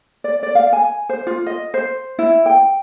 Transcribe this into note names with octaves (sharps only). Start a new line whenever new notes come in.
D5
D5
F5
G#5
C5
F4
D#5
C5
E4
G5